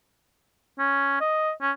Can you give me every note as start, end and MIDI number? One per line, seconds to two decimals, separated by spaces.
0.79 1.18 61
1.21 1.51 75
1.61 1.71 61